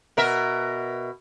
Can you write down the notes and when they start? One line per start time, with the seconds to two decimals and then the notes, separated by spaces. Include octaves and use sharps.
0.17 B2 A#4 E5